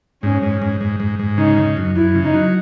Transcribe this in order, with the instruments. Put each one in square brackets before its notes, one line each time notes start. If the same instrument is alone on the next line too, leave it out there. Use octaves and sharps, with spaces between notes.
[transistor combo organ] G#2 [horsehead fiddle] C#4
[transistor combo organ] G#2
G#2
G#2
G#2
G#2
[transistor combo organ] C#3 [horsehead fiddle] D#4
[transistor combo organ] C#3
F#2
[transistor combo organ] F#2 [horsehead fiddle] E4
[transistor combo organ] C#3
[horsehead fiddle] D#4
[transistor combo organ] F#3